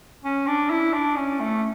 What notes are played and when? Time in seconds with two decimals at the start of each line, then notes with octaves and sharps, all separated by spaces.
0.24 C#4
0.47 D4
0.70 E4
0.94 D4
1.16 C#4
1.40 A3